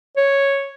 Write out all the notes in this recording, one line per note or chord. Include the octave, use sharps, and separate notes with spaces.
C#5